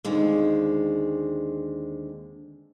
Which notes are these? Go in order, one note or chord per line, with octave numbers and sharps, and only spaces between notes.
D#2 D3 G#3 C4